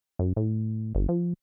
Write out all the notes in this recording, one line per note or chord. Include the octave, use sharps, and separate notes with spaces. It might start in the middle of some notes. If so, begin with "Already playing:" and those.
F#2
A2
G1
F3